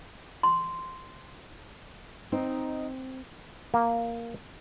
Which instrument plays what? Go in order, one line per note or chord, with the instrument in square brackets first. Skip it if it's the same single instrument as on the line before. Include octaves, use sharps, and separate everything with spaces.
[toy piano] C6
[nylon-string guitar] C4 [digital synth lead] D#4
[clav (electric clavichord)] A#3